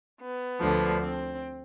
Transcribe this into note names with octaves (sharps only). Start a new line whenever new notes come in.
B3
D2 D3 F3
C4